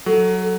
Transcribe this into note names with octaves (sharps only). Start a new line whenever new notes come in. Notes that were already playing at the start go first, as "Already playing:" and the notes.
F#3 A4